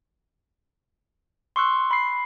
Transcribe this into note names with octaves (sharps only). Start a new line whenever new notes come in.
C6 C#6 E6 F#6
B5 C7